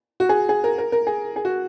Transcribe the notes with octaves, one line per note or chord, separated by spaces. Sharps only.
F#4
G#4
G#4
A#4
A#4
A#4
G#4
G#4
F#4